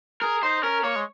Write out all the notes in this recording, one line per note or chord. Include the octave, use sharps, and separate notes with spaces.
G#4 A#4
D#4 C5
C#4 A#4
A#3 C#5
G#3